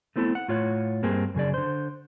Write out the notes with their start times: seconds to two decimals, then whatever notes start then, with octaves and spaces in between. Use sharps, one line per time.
0.16 A3 B3 C4 E4 A4
0.35 F#5
0.48 A2 F4 C#5 F#5
1.03 G2 A#3 C4 G#4
1.34 F#2 C#3 G#4 D5
1.54 D3 C5